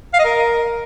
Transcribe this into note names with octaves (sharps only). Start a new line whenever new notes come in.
F5
D#5
A#4